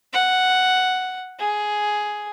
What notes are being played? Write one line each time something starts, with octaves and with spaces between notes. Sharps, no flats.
F#5
G#4